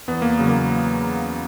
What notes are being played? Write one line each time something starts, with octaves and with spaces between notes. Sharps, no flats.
E2 B3
A#3
C#3 F#3
A#3